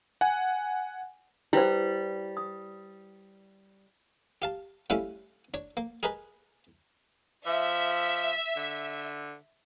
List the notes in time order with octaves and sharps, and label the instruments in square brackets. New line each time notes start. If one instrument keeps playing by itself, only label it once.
[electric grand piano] F#5 G#5
[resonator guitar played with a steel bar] G3 [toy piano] E4 B4 C5
[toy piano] D#6
[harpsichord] G4 F5 A5
G3 A3 C#4 E4 F5
D4 C#5
A#3
G#4 A#4 B4 D#5 B5
[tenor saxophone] F3 [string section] E5
[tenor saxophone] D3